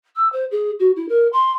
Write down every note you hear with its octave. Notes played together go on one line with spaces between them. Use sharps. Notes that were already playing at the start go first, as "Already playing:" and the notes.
E6
C5
G#4
F#4
E4
A#4
C6